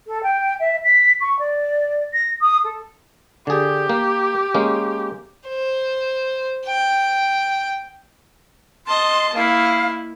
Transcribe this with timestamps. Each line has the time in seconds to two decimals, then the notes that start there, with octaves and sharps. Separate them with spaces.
0.07 A4
0.23 G5
0.59 E5
0.84 B6
1.20 C#6
1.39 D5
2.13 A#6
2.40 D#6
2.64 A4
3.47 D3 G4 G#4
3.89 A#3
4.54 G#3 A#3 C#4
5.49 C5
6.66 G5
8.87 D#5 A5 C6
9.35 A#3 E4 F5